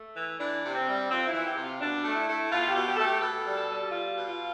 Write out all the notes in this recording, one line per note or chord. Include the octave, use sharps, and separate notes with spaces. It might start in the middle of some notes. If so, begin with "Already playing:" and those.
Already playing: A3
E3
E3 D4
C3
C4
G3
F2 C4
E4
E3
G4
C3
F4
B2 D4
A3
E4
A3
B2 F4
G4
B2
G4
A3 A4
G4
B2 A4
G3
A4
G3
B2 F4
B2
F4